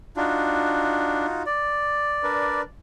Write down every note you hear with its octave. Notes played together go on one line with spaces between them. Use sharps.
D4 D#4 F4 F#4
D5
D4 A#4 B4